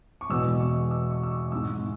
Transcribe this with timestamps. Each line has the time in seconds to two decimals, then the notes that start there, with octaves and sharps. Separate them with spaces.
0.21 C#6
0.29 E2 B2 G#3 E6
0.60 C#6
0.91 E6
1.11 C#6
1.23 E6
1.31 C#6
1.52 G#2 G#3 E6